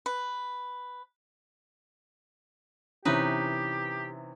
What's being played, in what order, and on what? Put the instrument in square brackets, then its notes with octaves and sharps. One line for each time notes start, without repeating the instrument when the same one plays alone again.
[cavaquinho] B4
[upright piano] C3 E3 C#4 [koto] D#4 B4 [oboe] G4